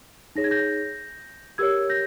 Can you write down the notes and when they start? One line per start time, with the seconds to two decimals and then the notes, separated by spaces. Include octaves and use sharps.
0.36 D#4 G#4 C#5 A#6
0.44 G#6
0.51 G6 A#6
1.58 G4 A#4 C#5 E6 G#6
1.89 G6 A#6